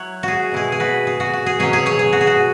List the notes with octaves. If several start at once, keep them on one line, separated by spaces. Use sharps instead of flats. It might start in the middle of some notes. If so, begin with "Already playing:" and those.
Already playing: F#3 E4 C#5 F#5
F#4 G#4
B2 G#3 E4 G#4
G#4
F#4 B4
G#4
F#4
F#4
G#4
B2 F#3 C#4 G#4 C#5
G#4 C#5
G#4 C#5
G#4
F#4
G#4
F#4